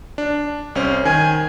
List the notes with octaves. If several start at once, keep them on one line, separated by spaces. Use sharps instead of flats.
D4
C2 C#4 C5
D#3 G#5